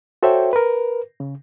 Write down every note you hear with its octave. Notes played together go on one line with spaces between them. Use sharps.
F#4 A4 C5 C#5 E5 G5
A#4 B4
C#3